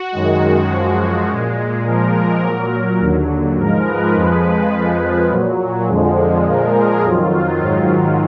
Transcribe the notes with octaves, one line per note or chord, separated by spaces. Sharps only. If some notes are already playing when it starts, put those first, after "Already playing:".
Already playing: F#4
F#2 D#3 G#3
F#2 F3 G#3
A#2 G#3
A#2 F3 G#3 A#4
A#2 F#3
D#2 D3 F#3
G#2 F3 G#3 A#4
B4
F2 F3 G#3 B4
F2 F3 G#3
A#2 F#3
F2 D3 F3 G#3
A#2 F3 G#3 A#4
G#4
F2 D#3 F#3 F4
G#2 D#3 F#3